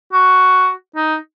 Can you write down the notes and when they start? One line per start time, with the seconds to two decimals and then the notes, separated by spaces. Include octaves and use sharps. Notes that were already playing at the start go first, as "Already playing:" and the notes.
0.13 F#4
0.96 D#4